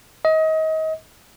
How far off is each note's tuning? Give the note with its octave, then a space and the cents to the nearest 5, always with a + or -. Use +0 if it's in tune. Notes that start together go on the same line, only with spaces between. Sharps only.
D#5 +30